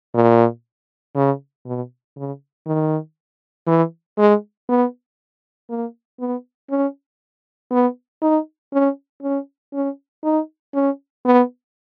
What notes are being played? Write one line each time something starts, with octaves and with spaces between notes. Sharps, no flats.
A#2
C#3
B2
C#3
D#3
E3
G#3
B3
A#3
B3
C#4
B3
D#4
C#4
C#4
C#4
D#4
C#4
B3